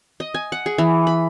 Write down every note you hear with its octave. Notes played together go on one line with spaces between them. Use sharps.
D#5
G#5
F#5
G#4
E3
B5